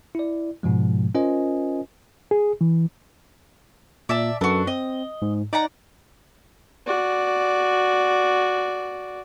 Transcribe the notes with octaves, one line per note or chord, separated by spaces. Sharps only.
E4 D5
G#2 B2 F3 G#3
C#4 F4 A#4 C5 D#5 G#5
G#4
E3
A#2 D5 E5 A5
F#2 D4 F#4 A4 B4
C4 D#5
G#2
D#4 D5 F#5 A#5
F#4 D5